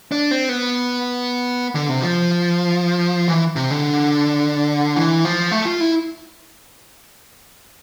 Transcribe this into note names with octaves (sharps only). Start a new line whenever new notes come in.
D4
C4
B3
D3
C3
F3
E3
C3
D3
E3
F3
A3
F4
E4